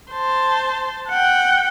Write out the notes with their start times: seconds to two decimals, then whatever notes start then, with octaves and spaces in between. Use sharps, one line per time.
0.12 C5 A5
1.09 F#5 G5